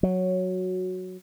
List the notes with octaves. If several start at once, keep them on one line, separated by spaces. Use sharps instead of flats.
F#3